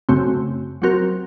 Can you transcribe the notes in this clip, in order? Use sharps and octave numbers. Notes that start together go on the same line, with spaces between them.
F#2 C#3 A3 C4 F#4
F#3 C4 F#4 A#4